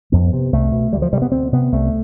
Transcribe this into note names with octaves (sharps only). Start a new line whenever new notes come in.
F2 B3
C3
C2 A3
B2
D2 G3
F3
C3 G3
B3
D2 C4
C3 B3
C2 A3